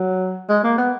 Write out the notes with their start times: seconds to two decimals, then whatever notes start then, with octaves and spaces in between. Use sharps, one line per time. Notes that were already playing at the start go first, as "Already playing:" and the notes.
Already playing: F#3
0.49 G#3
0.63 A#3
0.78 B3